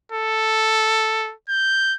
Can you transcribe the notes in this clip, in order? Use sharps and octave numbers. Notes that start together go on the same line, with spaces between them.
A4
G6